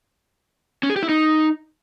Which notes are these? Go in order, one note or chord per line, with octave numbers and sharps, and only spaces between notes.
C#4
G#4
G4
E4
D#4